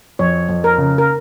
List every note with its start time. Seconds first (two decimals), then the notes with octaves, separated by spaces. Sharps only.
0.19 F2 C#5
0.49 F2
0.64 A#4
0.78 C#3
0.98 A#4